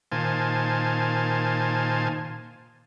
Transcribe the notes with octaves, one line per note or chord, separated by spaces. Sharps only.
A#2 D#3 C5 F5 G#5 A5